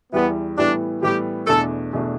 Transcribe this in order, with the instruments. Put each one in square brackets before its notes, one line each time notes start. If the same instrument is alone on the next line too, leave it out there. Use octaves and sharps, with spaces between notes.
[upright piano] E2 E3 G3 E4 [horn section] B3
[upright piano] A2 E3 G3 B3 [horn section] D4
[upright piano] A2 E3 G3 B3 [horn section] G4
[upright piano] E2 B2 A3 D4 [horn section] A4
[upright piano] E2 B2 A3 D4